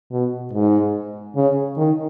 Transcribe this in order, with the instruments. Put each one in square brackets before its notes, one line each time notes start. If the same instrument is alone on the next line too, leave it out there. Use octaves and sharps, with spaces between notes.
[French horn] B2
G#2
C#3
D#3